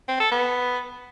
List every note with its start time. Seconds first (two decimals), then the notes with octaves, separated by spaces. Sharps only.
0.08 C4
0.20 A4
0.32 B3